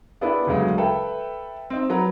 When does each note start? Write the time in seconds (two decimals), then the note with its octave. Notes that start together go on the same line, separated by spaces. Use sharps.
0.21 B3 D4 E4 G4 G#4 B4
0.47 D2 C#3 F#3 G#3
0.78 A4 B4 E5 G5
1.70 C4 D#4
1.89 F#3 B4 A#5